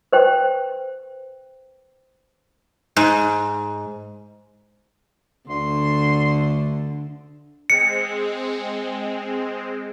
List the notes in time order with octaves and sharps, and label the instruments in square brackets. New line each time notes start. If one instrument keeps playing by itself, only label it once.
[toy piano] B4 C5 G5
[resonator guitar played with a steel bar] G#2
[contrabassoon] D2 [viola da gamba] D3 [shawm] C6
[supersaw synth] G#3 C4 [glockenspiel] C#7